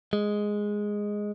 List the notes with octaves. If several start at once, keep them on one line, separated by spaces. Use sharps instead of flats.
G#3